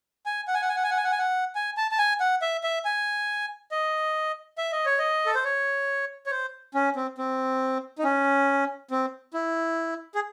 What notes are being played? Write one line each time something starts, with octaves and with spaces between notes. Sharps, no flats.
G#5
F#5
G#5
F#5
G#5
F#5
G#5
F#5
G#5
F#5
G#5
F#5
G#5
A5
A5
G#5
F#5
E5
E5
G#5
D#5
E5
D#5
C#5
D#5
A4
C5
C#5
C#5
C5
C#4
C4
C4
D#4
C#4
C4
E4
G#4